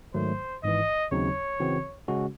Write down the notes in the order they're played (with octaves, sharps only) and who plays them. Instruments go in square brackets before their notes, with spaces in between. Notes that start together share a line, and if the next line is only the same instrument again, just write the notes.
[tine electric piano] G#2 D#3 F#3 A3 [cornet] C5
[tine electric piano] G#1 G#2 E3 [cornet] D#5
[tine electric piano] D#2 C#3 F#3 C4 D#4 [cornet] C#5
[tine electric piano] C#3 E3 C4 F#4
C#3 G#3 C#4 F#4